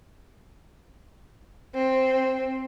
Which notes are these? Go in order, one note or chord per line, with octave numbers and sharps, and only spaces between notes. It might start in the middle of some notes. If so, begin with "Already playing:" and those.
C4